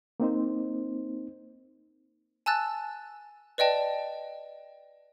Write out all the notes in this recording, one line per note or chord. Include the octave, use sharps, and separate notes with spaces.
A#3 C4 D#4 C5
G#5 A5 E6 F#6 A6
B4 D5 D#5 G5 A5